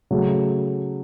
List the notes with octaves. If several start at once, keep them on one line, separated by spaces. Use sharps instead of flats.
C#3 F#3 A3